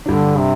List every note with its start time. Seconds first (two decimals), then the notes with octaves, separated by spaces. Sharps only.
0.06 G2 D3 G3 D4
0.39 C3